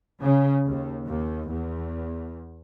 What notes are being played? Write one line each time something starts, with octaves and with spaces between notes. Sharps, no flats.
C#3
D#2
D#2
E2